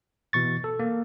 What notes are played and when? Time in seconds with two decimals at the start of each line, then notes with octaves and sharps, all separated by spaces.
0.33 B2 E3 C#6 A6
0.64 A4
0.79 A#3